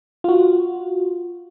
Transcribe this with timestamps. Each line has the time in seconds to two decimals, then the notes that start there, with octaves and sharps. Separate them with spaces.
0.24 F4 F#4